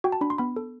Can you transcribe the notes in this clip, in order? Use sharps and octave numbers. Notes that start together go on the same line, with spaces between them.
F#4 G5
A5
D4 B5
C6
B3 B5
A4